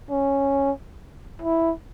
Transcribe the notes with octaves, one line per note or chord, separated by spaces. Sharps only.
C#4
E4